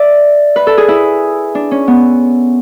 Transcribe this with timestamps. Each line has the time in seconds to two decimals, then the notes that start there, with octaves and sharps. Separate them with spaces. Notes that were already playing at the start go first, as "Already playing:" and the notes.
Already playing: D5 E5
0.56 B4
0.67 A4
0.78 G#4
0.88 E4
1.55 D4
1.71 C#4
1.88 B3